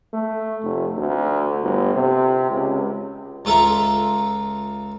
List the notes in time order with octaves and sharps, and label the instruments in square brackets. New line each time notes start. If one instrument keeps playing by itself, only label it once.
[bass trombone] A3
F1
D2
G1
C3
C#2
[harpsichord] C#2 F4 A4 E5 A#5